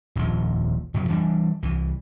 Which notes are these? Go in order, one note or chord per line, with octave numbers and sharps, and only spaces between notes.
D#1 A#1 F2 F3
F#2 C3 F3 F#3
E3 G3 D4
C2 E3